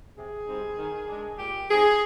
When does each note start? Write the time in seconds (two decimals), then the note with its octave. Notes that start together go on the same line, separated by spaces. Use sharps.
0.17 C3 G#4
0.47 G3 C4 D#4
0.78 D#3
1.08 G#3 D4
1.39 A#2 G4
1.69 F3 C4 D#4 G#4